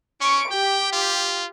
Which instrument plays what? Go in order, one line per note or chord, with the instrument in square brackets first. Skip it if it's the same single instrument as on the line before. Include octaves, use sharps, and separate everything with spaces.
[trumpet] C#4 [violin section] C#6 D7
[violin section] G4 [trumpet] G5
[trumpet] F4